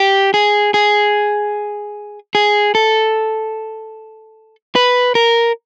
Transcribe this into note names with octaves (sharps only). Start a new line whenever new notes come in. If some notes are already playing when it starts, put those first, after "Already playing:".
Already playing: G4
G#4
G#4
G#4
A4
B4
A#4